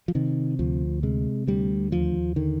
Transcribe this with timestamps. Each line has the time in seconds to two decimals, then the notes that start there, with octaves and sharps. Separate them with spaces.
0.08 F3
0.15 C3 D#3
0.59 D2 F3
1.03 C3 G#3
1.47 D2 G3
1.92 D#2 F3
2.36 D3 D#3